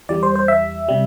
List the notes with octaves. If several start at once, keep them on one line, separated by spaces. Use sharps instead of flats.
E2 E3 G3 D5
C5
C5
E5
C3 G3